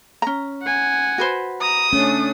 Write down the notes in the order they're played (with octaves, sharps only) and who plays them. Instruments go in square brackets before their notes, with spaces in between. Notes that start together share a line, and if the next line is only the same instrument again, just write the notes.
[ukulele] C#4 A#5
[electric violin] F#5 G#5
[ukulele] F#4 B4 C5
[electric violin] A#5 [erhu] D#6
[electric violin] A3 D4 [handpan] C#4